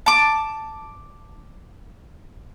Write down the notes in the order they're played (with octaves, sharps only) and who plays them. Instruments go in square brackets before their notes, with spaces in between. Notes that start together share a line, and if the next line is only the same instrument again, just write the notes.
[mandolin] A5 D6